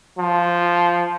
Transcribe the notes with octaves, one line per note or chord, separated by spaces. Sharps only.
F3